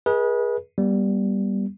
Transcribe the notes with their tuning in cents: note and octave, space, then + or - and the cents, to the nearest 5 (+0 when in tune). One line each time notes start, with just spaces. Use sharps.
G#4 +0 B4 -35 D#5 +40
G3 +0 B3 -35